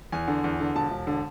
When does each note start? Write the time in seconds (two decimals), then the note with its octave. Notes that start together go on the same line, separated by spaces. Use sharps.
0.12 E2 G#5
0.28 D3
0.44 E2
0.60 D3
0.76 E1 A5
0.91 E1
1.07 D3